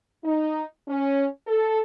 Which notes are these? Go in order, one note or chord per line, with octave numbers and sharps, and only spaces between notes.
D#4
C#4
A4